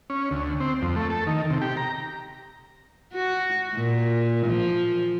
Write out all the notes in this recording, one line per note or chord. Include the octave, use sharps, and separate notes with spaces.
C#4
D2
C4
F2
A3
A4
D#3
C3
G4
A#5
F#4
A#2
F3